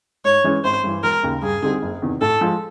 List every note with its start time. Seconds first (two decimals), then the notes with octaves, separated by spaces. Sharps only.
0.25 G#2 C#5
0.44 E3 G#3 C#4
0.64 G#1 C5
0.84 G2 E3
1.03 E1 A#4
1.23 D#2 C#3
1.42 G2 G#4
1.62 D3 G3 C4 D#4
1.82 F#1
2.02 E2 C3 D#3
2.21 A2 A4
2.41 F3 G#3